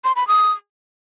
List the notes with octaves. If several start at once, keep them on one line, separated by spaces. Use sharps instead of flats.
C6
B5
D#6